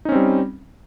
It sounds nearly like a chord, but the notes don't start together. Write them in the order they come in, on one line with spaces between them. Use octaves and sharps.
D#4 C#4 C4 G3